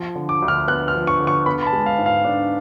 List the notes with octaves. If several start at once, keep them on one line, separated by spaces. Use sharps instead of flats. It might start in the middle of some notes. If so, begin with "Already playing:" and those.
Already playing: F3
D3
D6
D2
F6
B3 F#6
F6
F3
C#6
D3
C#6
B3 B5
B5
A5
G#3
F5
G#2
F5
D4